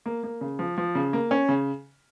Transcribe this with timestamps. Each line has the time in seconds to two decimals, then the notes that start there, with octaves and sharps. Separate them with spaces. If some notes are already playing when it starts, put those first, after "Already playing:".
0.06 A#3
0.23 A#3
0.41 C#3
0.59 F3
0.78 F3
0.95 C#3
1.13 A#3
1.31 C#4
1.49 C#3